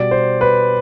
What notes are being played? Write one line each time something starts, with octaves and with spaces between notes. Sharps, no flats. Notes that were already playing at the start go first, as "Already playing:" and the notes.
Already playing: B2 G3 D5
C5
B4